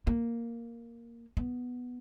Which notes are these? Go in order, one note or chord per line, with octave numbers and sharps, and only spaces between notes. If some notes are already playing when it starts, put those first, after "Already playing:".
A#3
B3